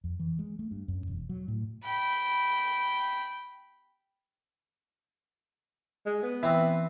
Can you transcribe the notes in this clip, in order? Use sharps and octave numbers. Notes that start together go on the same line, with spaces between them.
F2
E3
G#3
A3
G2
F#2
E1
F#3
A2
G5 B5
G#3
B3
E3 C4